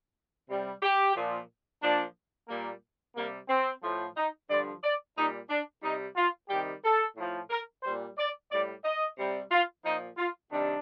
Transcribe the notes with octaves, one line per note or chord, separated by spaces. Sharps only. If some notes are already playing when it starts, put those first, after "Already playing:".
C3 G3
G4
A#2 F3
A#2 F3 D4
A#2 G3 A#3
C3 G3 A#3
C4
A2 F3
D#4
G2 D3 F3 D5
D5
A#2 G3 D#4
D4
C3 G3 D#4
F4
C3 D#3 G3 G4
A4
A2 F3
A#4
A#2 G3 C5
D5
A2 G3 D5
D#5
C3 G3
F4
A#2 F3 D#4
F4
C3 D#3 G3 D4